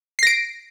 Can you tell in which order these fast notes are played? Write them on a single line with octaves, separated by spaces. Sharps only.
C7 A#6 D7